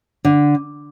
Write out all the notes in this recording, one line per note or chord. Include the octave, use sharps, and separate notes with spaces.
D3